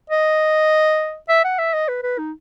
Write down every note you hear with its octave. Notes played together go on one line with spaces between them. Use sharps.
D#5
E5
F#5
E5
D#5
B4
B4
D#4